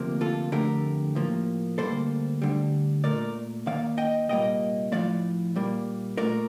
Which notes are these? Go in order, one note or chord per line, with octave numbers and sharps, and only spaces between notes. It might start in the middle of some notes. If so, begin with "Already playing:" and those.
Already playing: D2 C3 F3 A#3
F4 A4
F2 D3 A3 G4 A#4
A2 F3 A#3
D2 C3 G3 A#3 A4 C5
D2 D3 G3
A#2 A3 A#4 D5
D#2 D#3 A#3 D5 F5
D#5 G5
C2 A#2 G3 A#3 D#5 G5
A2 F3 A3 D5 F5
A#2 G3 A#3
A#2 A3 A#4 D5